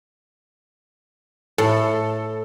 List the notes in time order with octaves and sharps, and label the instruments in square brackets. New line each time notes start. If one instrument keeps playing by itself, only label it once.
[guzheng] A2 [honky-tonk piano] A4